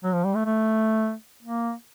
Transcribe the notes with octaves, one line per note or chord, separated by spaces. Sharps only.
F#3
F3
G3
A3
A3
A#3